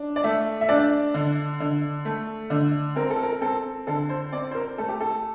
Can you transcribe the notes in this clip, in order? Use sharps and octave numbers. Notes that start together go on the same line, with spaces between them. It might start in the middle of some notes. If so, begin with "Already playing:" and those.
Already playing: D4
D5
A3 E5
E5
D4 D5
D3
D3
A3
D3
C4 A#4
A4
A#4
C4 A4
D3 A4
C5
C4 D5
C5
A#4
A3 A4
G4
A4